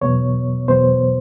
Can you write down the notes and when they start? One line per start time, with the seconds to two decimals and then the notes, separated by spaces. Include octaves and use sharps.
0.01 E2 B2 F#3 B3 C#5
0.68 E2 B2 F#3 B3 C5